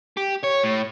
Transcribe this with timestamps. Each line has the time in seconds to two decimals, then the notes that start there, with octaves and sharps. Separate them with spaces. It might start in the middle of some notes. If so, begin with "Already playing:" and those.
0.17 G4
0.44 C#5
0.64 A2